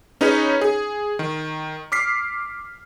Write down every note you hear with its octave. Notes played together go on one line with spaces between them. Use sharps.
C#4 D#4 G#4 B4 C#5
G#4
D#3
D6 F6 B6 C7